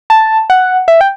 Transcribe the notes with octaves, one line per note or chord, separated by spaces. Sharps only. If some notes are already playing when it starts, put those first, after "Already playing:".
A5
F#5
E5
G5